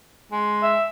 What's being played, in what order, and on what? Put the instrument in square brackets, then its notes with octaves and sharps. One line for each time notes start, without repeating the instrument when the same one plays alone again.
[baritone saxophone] G#3
[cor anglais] E5